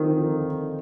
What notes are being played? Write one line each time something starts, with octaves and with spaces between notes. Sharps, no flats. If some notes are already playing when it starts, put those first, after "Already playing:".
Already playing: D3 D#3 F3 C4 D#4